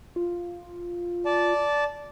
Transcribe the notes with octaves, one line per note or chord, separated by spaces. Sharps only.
F4
D5 A5